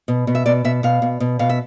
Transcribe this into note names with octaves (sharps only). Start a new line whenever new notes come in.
B2
B2
E5
B2 D5
B2 E5
B2 F5
B2
B2
B2 F5
E5